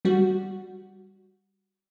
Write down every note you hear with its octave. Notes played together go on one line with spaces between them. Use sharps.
G3 F#4